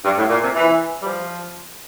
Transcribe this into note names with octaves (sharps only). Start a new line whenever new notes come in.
G2
A2
A#2
C3
E3
G3
F3